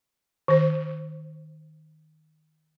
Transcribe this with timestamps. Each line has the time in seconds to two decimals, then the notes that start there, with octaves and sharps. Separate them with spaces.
0.48 D#3 C5